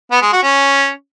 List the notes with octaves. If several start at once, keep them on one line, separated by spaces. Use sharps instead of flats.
B3
G#3
F#4
C#4